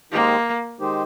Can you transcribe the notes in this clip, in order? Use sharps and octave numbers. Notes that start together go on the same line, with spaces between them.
D#3 G#3 A#3 D#4 G4 C5
D#3 G#3 D#4 G4 C5